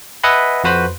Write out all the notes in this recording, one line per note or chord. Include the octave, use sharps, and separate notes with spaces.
B4 D#5 E5 F#5 G#5 B5
F2 F#4 B4 C5 B5